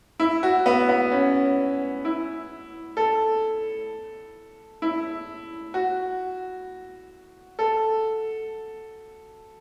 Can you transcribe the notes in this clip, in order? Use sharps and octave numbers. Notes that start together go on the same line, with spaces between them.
E4
F#4
B3
B3
C#4
E4
A4
E4
F#4
A4